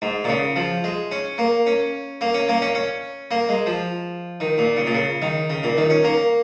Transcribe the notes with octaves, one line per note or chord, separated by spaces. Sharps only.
G#2
A#2
C#3
F3
G#3
C#4
A#3
C#4
A#3
C#4
A#3
C#4
C#4
A#3
G#3
F3
D#3
A#2
C#3
A#2
C#3
D#3
C#3
A#2
D#3
C#4
A#3